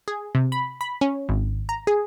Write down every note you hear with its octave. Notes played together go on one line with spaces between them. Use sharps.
G#4
C3
B5
B5
C#4
G#1
A#5
G#4